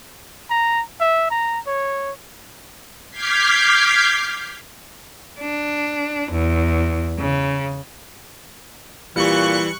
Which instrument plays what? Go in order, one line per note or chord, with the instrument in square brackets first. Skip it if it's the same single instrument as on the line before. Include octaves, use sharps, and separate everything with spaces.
[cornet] A#5
E5
A#5
C#5
[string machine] D6 F6 G6 G#6 B6 C7
[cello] D4
E2
C#3
[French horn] A#2 [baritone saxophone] E3 [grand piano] G3 [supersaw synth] C#6 F#6 C#7